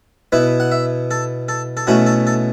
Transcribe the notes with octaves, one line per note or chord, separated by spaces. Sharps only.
B2 B3 E4 B4
F#5
E5
A4
A4
A4
B2 A3 C#4 E4 F#4
A4
A4